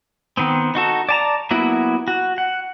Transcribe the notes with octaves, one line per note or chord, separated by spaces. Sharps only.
D#3 B3 C4
D#4 F#4 A4
D5 A5 A#5
F#3 A#3 B3 E4 F#4
F#4
F#5